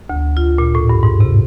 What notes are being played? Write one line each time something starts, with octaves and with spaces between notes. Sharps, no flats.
D2
F4
A#2
A2
G2
G#2
C3